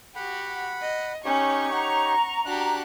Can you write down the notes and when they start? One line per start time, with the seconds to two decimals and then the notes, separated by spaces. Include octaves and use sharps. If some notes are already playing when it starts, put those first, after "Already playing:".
0.16 F#4 G4 F#5 B5
0.81 D#5
1.25 C#4 D#4 G4 C#5 C#6
1.74 F#5 A#5
2.46 D4 F#4 G4 F#6